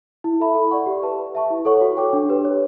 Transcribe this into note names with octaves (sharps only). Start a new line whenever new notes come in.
E4
A4 E5 B5
A4
D5 F#5 C#6
G4
B4 E5 A5
B4
E5 A5 C#6
E4
A4 C#5 F#5 C#6
F#4
A4 C#5 G5 D6
D4
G4 B4
C#5